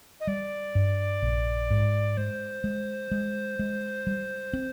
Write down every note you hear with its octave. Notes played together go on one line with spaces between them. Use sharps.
D#5
G3 D5
G2
A#1
G#2
G#3 C5
G#3
G#3
G#3
G3
C4